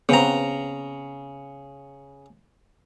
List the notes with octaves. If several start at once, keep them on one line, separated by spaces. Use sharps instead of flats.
C#3 B3 C4 A#5